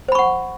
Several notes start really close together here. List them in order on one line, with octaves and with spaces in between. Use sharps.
C5 B5 C#6 F#5